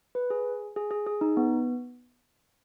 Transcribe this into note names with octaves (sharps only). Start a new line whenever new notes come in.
B4
G#4
G#4
G#4
G#4
D#4
B3